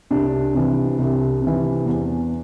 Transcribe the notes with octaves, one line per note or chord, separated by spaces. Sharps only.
C2 D4
C3 E3
C2
C3
E3
E2